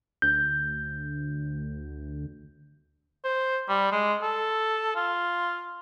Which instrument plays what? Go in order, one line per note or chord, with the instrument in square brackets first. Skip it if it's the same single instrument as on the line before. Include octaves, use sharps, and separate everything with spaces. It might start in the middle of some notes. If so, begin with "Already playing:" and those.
[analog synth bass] D2 [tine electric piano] G6
[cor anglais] C5
G3
G#3
A4
F4